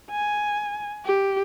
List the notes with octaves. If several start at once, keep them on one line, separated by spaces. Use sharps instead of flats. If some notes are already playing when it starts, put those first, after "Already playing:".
G#5
G4